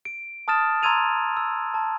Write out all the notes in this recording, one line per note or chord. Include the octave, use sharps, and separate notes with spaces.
D7
A5 D#6 F6 A6 E7
A#5 C6 E6 G#6 D#7 F7
E6
A5